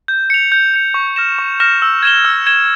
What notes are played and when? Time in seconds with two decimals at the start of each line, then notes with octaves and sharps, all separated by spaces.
0.08 G6
0.30 C#7 F7
0.52 G6
0.74 C#7 F7
0.94 C#6
1.16 F6 A#6 E7
1.39 C#6
1.60 F6 A#6 E7
1.82 E6
2.03 G#6 E7 G7
2.25 E6
2.46 G#6 E7 G7